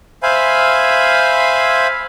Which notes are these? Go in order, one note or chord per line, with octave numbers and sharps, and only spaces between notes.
C5 E5 F5 G#5 B5